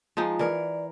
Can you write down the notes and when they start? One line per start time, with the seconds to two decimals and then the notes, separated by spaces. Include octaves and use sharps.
0.17 F3 G#3 D#4
0.39 E3 A#4 D5